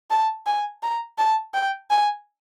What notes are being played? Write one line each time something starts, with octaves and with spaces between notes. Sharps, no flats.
A5
G#5
A#5
A5
G5
G#5